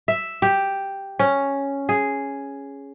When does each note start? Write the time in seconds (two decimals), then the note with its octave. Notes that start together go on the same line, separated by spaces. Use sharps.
0.08 E5
0.42 G4
1.19 C#4
1.89 G#4